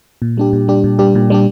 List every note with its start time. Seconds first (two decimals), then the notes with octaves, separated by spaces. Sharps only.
0.22 A#2
0.37 G3 D4 G4
0.53 A#2
0.68 G3 D4 G4
0.84 A#2
0.99 G3 D4 G4
1.15 A#2
1.30 G3 D4 G4